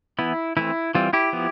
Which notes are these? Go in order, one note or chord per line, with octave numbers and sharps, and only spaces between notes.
E3 B3 E4
E3 A3 C4 E4
E3 G3 C4 F4
E4 G4
F3 B3